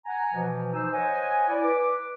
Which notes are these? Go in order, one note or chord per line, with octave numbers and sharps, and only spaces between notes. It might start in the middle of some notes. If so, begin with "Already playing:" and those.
F#5 G#5 A#5
B2 E3 F3
E3 F3 D#4 C5 G#5 E6
C5 C#5 D#5 F#5 G#5
E4 D5
B4 D6